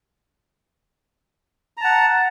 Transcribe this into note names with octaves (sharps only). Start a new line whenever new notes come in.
F#5 A5 A#5